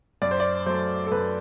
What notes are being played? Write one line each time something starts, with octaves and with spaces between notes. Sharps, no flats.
F#2 D5
C5
D5
F#3 A3 C5
A4
F#2 B4